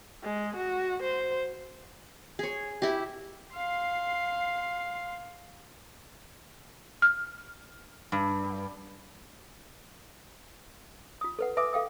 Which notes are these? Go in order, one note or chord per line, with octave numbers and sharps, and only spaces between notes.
G#3
F#4
C5
G#4 C#5
E4 G4
F5 C6
F6
G2
F4 D#6
A4 B4 F#5
B4 E5 G#5 D6 D#6
A4 F5 G5 D#6